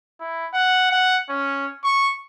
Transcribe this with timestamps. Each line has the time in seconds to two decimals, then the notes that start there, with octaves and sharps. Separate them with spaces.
0.20 E4
0.54 F#5
0.92 F#5
1.29 C#4
1.84 C#6